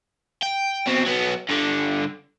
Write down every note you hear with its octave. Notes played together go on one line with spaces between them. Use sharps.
G5
B2 C4
F#3 B3
G2 D3